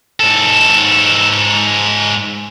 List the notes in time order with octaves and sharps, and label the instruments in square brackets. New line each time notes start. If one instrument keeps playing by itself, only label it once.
[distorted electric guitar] G#2 A4